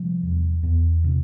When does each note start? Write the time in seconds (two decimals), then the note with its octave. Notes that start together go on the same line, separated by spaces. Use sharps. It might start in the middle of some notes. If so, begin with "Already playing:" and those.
Already playing: C3 F3 G3
0.23 E2
0.63 E2
1.04 C3